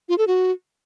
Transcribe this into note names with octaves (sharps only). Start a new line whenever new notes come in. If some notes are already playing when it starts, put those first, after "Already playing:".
F4
A4
F#4